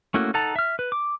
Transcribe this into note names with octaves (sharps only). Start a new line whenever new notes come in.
A3 A#3 C#4 E4 F#4
D#4 A4 F#5 A5 A#5
E5 F6
B4
D6